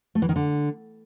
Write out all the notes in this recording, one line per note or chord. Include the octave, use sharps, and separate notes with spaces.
A3
E3
D#3
D3